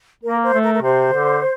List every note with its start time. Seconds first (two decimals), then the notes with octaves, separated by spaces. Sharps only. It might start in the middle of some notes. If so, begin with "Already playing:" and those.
0.23 A#3 A#4
0.43 C5
0.53 A3
0.63 A#4
0.74 A#4
0.82 C3 C5
1.12 D3